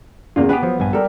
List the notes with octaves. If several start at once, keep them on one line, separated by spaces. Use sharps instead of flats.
E2 C#3 A#3 F4
B3 G4 G#4 B4 F#5
F3 F#3
A#1 G2 G#5
G3 A4 A#4